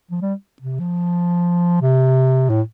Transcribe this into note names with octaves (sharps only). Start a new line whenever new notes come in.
F3
G3
C3
F3
C3
A2